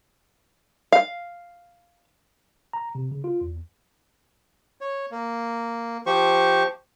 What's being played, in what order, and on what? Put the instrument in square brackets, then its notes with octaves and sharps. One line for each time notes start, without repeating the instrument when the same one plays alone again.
[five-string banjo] F5
[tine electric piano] A#5
C3
C#3
F4
E2
[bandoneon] C#5
A#3
F3 G4 C5 C#6